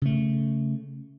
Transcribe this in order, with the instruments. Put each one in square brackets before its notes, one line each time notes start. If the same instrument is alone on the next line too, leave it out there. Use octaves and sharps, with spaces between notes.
[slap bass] C#3 A3